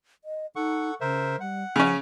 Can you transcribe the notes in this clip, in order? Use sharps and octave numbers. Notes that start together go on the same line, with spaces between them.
D#5
D#4 A4 F#5 C#6
C#3 A#4 C5 E5
G3 F#5
C#3 F3 C#4